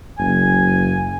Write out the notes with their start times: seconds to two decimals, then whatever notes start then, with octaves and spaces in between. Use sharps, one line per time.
0.19 F#1 G#5